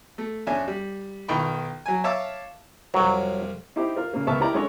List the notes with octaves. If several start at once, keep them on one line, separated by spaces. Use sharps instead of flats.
A3
F2 C#4 D4 E5 G#5
G3
B1 D#3 F4 G5 B5 C#6
F#3 G#5
C#5 E5 F5 A5 D6 E6
C2 F2 F#3
D#4 E4 G4 C5 D6
F4 A#4
C#3 A#3
C#2 B3 A#4 E5 A5 C#6
D#4 E4 G4 A#4 D5 A#5
G#3 C#4 D4 A4 C#5